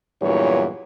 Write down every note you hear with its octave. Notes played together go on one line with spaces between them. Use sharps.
E2 G2 A#2 F#3 E4 C#5